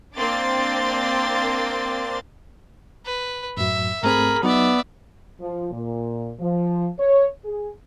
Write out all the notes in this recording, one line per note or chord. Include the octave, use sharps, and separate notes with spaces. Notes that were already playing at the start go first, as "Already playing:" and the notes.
A#3 C4 D4 C6 D6 A6
B4
F#2 A2 F#3 E5
G#2 A3 C4 G#4 A#4 B5
F#3 B3 D#4 D5 E5
F3
A#2
F3
C#5
G#4